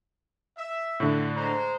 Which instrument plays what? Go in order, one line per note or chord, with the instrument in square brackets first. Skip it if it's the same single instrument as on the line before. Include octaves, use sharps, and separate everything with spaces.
[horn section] E5
[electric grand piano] A2 D3
[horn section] G#3 C5 A#5